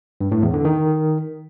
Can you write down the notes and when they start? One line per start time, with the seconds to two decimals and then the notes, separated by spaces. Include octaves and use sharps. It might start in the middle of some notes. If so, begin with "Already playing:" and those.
0.21 G2
0.32 A2
0.43 E2
0.54 D3
0.65 D#3